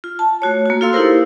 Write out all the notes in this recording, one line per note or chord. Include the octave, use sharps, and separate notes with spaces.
F4
A5
A3 F#4 C#5
A#3 F#4
F4 A4 F5 C6 E6
D#4 E4 G4 A#4 C5